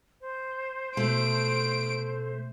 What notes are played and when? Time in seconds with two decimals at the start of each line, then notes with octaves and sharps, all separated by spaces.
0.21 C5
0.97 B2 A3 D7